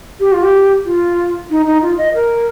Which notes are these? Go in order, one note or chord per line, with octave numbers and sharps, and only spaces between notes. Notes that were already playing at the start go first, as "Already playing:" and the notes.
G4
F4
G4
F4
D#4
D#4
F4
D#5
A#4